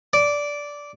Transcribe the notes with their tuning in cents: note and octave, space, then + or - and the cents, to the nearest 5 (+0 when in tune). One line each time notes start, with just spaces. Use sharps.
D5 -10